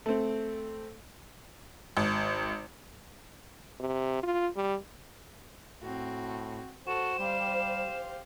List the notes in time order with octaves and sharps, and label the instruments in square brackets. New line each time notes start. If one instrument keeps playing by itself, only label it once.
[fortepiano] A3 C4
[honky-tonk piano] G#1
[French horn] C3
F4
G3
[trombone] A2 [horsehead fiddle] C4 F#4
[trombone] F#4 [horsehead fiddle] A4 [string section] C5 [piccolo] E7
[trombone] G3 [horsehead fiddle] G4 F5